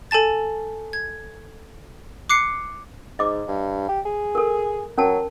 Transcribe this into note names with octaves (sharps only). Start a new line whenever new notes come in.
A4 G#5 A5 A6
G#6
D6 F#6 C7 C#7
G#2 D#5 D6
G2
G4
G#4
A4 A#4
F#3 C#4 A#4 A5